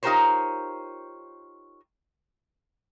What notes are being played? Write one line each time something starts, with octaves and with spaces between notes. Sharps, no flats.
D#4 F4 G4 A#4 C5 C#5